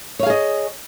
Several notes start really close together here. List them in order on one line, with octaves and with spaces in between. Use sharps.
C#5 F5 G#4 D#5